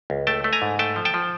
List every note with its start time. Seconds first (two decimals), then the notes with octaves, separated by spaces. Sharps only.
0.10 C#2
0.27 A3 G5 A5
0.44 A3
0.53 G#5 A#5
0.62 G#2
0.79 A3 G5 A5
0.96 F3
1.05 G5 A5
1.14 F3